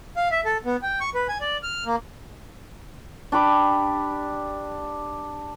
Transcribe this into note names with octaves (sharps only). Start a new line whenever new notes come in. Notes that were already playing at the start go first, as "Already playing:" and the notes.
F5
E5
A4
B3
G5
C#6
B4
G#5
D5
F6
A#3
D4 G4 B5 D6